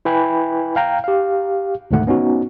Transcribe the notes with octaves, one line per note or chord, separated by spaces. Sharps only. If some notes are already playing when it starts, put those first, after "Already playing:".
E4 B4 G5 G#5 B5
F5 G5 A#5
G4 F5
D2 G#2 B2 D#3 A3 F#5
B3 C#4 D#4 F#4